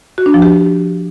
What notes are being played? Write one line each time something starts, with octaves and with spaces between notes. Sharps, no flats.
F#4
D4
F3
G4